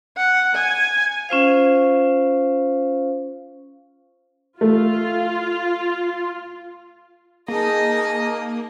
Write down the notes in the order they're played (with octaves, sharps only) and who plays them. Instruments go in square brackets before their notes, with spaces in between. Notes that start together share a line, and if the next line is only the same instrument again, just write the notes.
[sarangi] F#5
G#5
[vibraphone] C#4 F4 C5 F5
[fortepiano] A3 [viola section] F4
[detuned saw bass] A#3 [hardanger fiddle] D#4 D#5 [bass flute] G#4 [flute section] A5